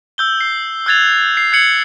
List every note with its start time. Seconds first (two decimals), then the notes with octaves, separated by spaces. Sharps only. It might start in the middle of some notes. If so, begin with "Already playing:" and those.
0.18 E6 G6 G7
0.41 C7
0.86 E6 F#6 G#6 A6 F7
1.37 C7
1.52 F#6 G#6 C#7 F#7